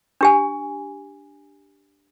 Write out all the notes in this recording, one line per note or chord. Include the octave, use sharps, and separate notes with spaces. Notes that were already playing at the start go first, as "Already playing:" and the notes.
D4 G4 G#5